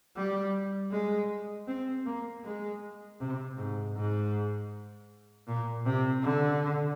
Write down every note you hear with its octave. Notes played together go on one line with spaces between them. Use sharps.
G3
G#3
C4
A#3
G#3
C3
G#2
G#2
A#2
C3
D3